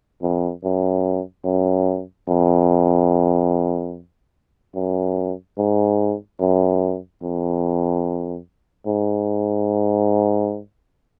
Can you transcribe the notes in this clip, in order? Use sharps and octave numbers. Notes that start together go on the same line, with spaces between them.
F2
F#2
F#2
F2
F#2
G#2
F#2
F2
G#2